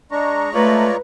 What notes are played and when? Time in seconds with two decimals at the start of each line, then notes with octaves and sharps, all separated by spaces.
0.11 G#3 D4 A#5 C#6
0.54 A3 F4 B4 C#5 D5